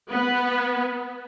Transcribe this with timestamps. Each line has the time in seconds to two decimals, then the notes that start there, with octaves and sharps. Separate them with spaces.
0.11 B3